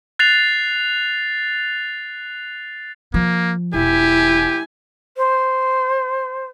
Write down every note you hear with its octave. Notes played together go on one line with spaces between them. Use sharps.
F#6 A6 C7 F7
F3 A#3
E1 E4 G4 G#5
C5